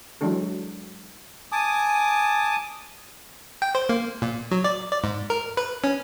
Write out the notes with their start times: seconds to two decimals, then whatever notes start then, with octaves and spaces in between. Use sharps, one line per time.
0.21 E3 F#3 G#3 D4 A4
1.52 G#5 A5 D6 D#6
3.62 G5
3.75 C5
3.89 A#3
4.22 A#2
4.51 F#3
4.64 D5
4.92 D5
5.04 G#2
5.30 A#4
5.57 B4
5.84 C#4